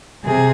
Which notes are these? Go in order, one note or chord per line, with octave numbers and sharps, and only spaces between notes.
C3 G#4